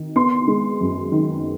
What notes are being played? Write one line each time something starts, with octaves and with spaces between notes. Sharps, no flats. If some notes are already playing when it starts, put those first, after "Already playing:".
Already playing: D#3
B3 C6
G#3
F#2
D#3